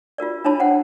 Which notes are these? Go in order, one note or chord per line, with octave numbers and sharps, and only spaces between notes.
F4 F#4 A#4 D5
D4 E4 C#5 A5 B5
C5 F#5 G5